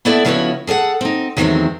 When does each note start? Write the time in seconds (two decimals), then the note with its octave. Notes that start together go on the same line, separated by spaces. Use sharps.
0.05 A3 B3 E4 A4 D5 E5
0.25 C#3 F3 B3 E4 F#4 C#5
0.67 G#4 A4 C#5 F#5
1.01 C4 D#4
1.37 E2 D#3 F#3 G#3 A3 C4